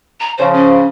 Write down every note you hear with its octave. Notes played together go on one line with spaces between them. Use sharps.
A#5
C#3 F3 C5
C#4